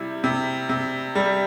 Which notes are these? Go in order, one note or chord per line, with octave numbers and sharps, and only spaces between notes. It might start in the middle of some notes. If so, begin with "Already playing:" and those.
Already playing: C3 G3 E4
C3
C3
G3